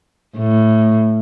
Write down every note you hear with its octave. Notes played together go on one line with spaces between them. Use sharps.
A2